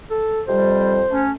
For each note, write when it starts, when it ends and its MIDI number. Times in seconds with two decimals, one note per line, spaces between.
0.11 0.42 69
0.48 1.01 41
0.48 1.01 48
0.48 1.01 55
0.48 1.21 72
1.10 1.32 57
1.10 1.32 61